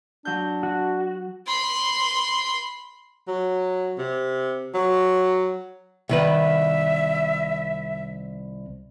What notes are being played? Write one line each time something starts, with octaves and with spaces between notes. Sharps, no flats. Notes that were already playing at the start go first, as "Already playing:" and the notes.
F#3 D4 G6
F#4
B5 C6
F#3
C3
F#3
C2 D#3 B4 E5